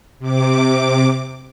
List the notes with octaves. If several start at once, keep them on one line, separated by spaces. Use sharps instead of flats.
C3 D6